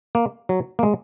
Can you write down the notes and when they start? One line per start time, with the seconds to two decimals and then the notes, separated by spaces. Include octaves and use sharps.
0.15 A#3
0.49 F#3
0.79 A#3
0.83 G#3